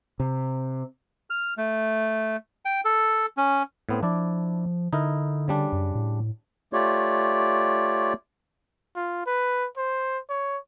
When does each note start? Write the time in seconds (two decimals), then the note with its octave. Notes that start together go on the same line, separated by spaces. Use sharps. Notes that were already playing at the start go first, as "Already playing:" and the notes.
0.20 C3
1.30 F6
1.57 A3
2.65 G5
2.85 A4
3.37 C#4
3.89 A2 B3 C4
4.03 F3 D4 E4 D5
4.93 D3 D#4 E4 A#4
5.48 C#3 G3 D4
5.73 F#2
5.95 A2
6.73 A3 F4 G4 C#5 D5
8.96 F4
9.26 B4
9.77 C5
10.29 C#5